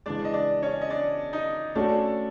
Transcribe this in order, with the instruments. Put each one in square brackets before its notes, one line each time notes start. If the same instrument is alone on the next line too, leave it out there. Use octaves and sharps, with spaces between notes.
[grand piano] C#3 E3 G#3 [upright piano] D4 D5
[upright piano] D#5
D4 D5
C#4 C#5
D#5
D4 D5
D#4 D#5
[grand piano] A3 C#4 F#4 A4 [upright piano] D4 D5